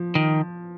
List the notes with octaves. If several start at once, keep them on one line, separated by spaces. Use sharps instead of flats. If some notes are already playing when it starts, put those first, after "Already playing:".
Already playing: F3
D#3